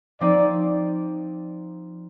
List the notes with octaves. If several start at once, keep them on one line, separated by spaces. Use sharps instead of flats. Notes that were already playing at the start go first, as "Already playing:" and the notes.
F3 C4 D#4 D5